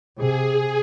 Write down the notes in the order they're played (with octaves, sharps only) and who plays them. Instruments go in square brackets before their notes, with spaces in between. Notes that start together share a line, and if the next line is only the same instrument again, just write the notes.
[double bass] C3 [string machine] G#4